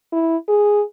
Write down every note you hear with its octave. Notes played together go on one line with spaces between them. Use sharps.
E4
G#4